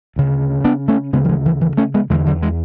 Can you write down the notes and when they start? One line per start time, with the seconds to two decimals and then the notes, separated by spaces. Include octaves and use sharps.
0.16 D2 C#3
0.64 B3 D4
0.88 A3 C#4
1.13 D2 C#3 G#3 B3
1.24 F#3
1.29 E3 G#3
1.46 E3
1.61 E3
1.77 A3 C#4
1.94 G#3 B3
2.10 E2 D3 E3 G#3
2.26 D3 F#3
2.42 E3 G#3